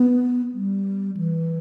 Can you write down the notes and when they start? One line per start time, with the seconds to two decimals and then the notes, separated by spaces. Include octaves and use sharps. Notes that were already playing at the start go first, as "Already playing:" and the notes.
Already playing: B3
0.54 G3
1.17 E3